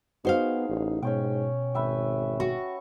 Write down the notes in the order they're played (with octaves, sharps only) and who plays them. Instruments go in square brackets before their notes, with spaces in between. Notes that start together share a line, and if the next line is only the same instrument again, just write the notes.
[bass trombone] B3 [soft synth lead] D#4 [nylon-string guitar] F#4 C5 F5 [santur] G#4
[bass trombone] A1
[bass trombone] G#2 [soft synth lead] B2 [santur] C#4 C#5 G5
[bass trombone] G#1 [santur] B4 E5 G5
[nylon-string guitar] F#4 [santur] C#6